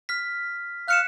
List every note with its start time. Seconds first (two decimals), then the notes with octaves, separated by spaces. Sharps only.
0.09 F6 B6
0.88 F5 F#6 C#7 E7